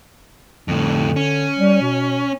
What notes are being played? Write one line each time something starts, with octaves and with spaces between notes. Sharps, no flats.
F2 A2 D3
C#4
G3
B2